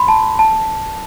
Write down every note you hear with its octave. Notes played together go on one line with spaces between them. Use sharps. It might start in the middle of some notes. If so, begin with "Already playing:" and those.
Already playing: B5 C6
A5
A5